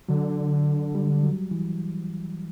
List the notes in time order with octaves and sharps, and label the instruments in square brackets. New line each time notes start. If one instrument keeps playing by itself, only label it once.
[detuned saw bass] D3 [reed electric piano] F#3
[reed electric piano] G3
F#3
E3